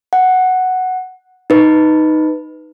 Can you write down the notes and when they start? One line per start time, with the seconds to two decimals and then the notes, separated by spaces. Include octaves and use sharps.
0.13 F#5
1.50 D#4 B4